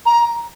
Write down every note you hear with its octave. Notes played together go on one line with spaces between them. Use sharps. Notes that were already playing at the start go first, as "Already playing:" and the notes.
A#5